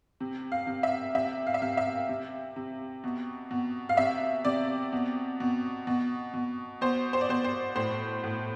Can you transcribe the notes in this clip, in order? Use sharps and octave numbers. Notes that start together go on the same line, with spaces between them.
C3
F5
C3
E5
C3 E5
F5
E5
C3 F5
E5
C3
C3
B2
B2
F5
C3 E5
C3 D5
B2
B2
B2
B2
B2 C5
C5
D5
B2 C5
C5
A2 C5
A2